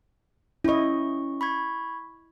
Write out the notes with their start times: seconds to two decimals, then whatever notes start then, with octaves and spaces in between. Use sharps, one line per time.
0.64 C#4 E4 D#5 C#6
1.41 B5 C#6 G#6